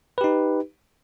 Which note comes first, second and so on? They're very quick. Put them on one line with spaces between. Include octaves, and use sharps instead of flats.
B4 G4 D#4